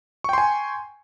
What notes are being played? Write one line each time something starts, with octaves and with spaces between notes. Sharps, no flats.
G5 G#5 C6 C#6